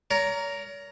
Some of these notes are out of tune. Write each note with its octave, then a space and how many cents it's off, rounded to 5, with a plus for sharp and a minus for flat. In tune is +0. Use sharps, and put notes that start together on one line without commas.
A#4 +0 C#5 +40